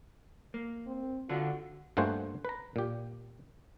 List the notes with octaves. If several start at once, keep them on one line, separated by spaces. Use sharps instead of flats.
A#3
C4
D3 D4 F4 F#4
G2 A3 A#3 F#4 C5 G#5
B4 A#5
A#2 G4